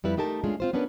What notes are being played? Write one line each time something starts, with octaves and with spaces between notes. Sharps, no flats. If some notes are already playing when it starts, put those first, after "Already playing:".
F2 G3 E4 B4
A3 D#4 G4 A#4 A5
G#3 A3 C#4 D4 F4 G#4
C4 F4 C5
B3 C#4 D4 A#4 B4